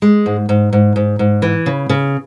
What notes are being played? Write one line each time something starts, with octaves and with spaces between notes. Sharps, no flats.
G#3
G#2
G#2
G#2
G#2
G#2
E3
C#3
C#3